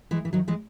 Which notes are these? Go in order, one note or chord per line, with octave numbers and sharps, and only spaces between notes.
E3 G#3
E3
D#3 F#3
E3 G#3